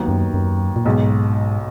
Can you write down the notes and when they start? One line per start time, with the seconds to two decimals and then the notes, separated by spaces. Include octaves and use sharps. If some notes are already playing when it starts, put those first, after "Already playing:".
Already playing: D#2 D#3 F#3 B3
0.08 F#2
0.34 F#2
0.76 A#2
0.85 B1 G#2 B2 G#3